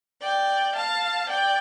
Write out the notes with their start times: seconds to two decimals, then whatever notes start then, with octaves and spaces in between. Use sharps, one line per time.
0.21 D5 G5
0.76 F5 A5
1.29 D5 G5